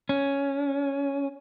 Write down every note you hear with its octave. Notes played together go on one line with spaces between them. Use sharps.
C#4